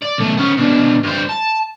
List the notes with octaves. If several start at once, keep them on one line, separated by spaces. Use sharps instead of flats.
D5
B1 A3
B3 C#4
B2 D4
G2 C5
A5